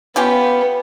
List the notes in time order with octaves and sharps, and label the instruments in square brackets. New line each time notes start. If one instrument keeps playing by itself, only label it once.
[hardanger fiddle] B3 [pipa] C#4 F4 G4